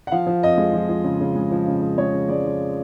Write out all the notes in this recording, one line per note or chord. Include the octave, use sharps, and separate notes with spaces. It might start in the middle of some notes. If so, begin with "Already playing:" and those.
F#5
F3 F5
F3
F2 D#5
G#3
F3
F3
C#3
C#3
G#3
F3
C#3
C#3
G#3 C#5
C#3
G#3 D5
F3